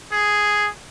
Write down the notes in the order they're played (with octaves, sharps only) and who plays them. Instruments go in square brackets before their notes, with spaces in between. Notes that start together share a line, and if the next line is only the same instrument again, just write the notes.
[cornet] G#4